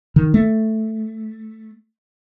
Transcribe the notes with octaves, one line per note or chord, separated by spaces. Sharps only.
D#3
A3